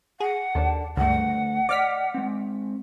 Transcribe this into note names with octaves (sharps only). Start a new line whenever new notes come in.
G#4 F#5
D#2 D4 A4
C#2 G2 D3 A3 F#5
D5 D#5 D6 F6 B6
G#3 C4